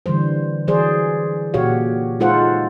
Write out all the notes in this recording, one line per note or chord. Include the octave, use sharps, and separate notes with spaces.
D3 E3 G3 C5
E3 F#3 G#4 C5 D5
A#2 F#4 G4 C#5 F5
G#3 D#4 F4 A4 C5 F#5